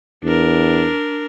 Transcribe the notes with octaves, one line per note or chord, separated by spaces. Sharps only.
E2 D4 A#4